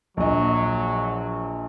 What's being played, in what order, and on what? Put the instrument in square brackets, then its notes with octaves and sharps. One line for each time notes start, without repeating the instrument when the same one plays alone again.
[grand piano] A#1 D#5 [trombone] F#3